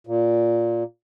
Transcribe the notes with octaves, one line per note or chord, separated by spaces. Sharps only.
A#2